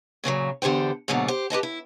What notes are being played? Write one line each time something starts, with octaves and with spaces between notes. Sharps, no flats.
A#2 C#3 E3 F#3
E2 D3 G4 C5 G5
G#2 B2 D3 F#3 A#3
G4 C5
G4 B4 D#5 A5
E4